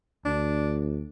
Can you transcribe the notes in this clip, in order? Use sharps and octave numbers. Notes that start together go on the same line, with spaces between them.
D2 D4